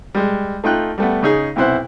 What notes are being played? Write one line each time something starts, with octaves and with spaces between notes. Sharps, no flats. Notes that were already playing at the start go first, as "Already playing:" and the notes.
G3 G#3
A3 D#4 F4 G5 F#6
G3 A3 B3
C#3 D#4 G#4
B1 C3 B3 E4 C5 F#6